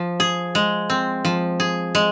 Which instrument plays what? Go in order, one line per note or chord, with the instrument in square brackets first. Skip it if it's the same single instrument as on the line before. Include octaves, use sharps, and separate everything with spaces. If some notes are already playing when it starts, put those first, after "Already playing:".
Already playing: [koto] F3
G#4
G#3
C4
F3
G#4
G#3